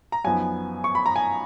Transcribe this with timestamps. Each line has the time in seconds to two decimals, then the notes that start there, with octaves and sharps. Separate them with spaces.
0.12 A#5
0.24 F#2 F3 B3 D#4 G#5
0.84 C#6
0.95 B5
1.06 A#5
1.16 G#5